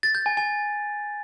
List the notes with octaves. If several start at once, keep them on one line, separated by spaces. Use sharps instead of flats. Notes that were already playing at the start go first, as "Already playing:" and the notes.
A6
G6
G#5
G#5